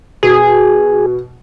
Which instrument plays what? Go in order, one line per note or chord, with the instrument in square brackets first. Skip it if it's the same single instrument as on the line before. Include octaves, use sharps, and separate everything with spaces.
[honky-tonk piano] B2 [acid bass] G#4